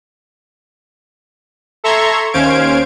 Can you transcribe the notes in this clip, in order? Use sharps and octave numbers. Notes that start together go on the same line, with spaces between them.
A4 E5 A#5 C6 C#6 G#6
D#2 C#4 C5 F5 G#6 D7